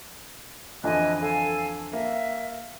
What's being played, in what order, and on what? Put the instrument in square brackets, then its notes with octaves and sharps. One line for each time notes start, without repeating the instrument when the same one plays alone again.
[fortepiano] F2 D3 E3 [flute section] D#5 G#5 F#6
[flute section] A4 F5 G#5
[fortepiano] A#3 [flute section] E5